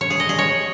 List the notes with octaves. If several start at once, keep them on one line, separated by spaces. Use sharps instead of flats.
C#5
G#4
D#5
G#4
C#5